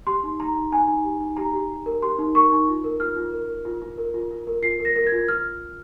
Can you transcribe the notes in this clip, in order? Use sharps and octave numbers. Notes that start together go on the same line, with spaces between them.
G4 C6
D#4
D#4 A#5
D#4
D#4 G#5
D#4
G4
D#4
G4 A#5
G4
G4
A#4
G4 C6
D#4
A#4 C#6
D#4
F4
A#4
F4 F6
F4
A#4
A#4
F4
F4
A#4
F4
F4
A#4
F4 C7
A#4
A#6
A#4 A#6
G#6
F4
F4 F6